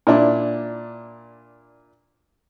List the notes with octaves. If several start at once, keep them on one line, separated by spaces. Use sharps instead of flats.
A#2 D4 E4